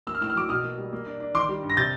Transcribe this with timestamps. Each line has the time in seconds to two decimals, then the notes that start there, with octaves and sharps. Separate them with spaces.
0.07 A#3 E6
0.15 F6
0.21 A2 E6
0.30 F6
0.35 F#3 D6 E6
0.49 B2 D#6 F6
0.63 A#3
0.78 G3
0.92 A#3
1.06 D4
1.20 D4
1.34 D#3 C6 D6
1.49 G3
1.63 G2
1.70 A#6
1.77 C3 G6 A6